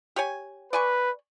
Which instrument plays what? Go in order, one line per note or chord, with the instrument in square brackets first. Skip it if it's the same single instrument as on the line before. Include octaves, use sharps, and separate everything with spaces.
[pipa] G4 C#5 G#5
[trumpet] B4 [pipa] D5 G#5 C#6